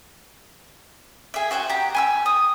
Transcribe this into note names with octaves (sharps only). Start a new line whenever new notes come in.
G#4 E5
F#4 C5 F#5 G5
G4 A#5
G#5 C6 E6
D#6